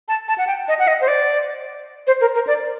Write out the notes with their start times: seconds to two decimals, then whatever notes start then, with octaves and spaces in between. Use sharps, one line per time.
0.08 A5
0.28 A5
0.38 F#5
0.47 G5
0.68 D#5
0.79 F#5
0.88 D#5
1.01 C5
1.08 D5
2.07 C5
2.21 A#4
2.35 A#4
2.47 D5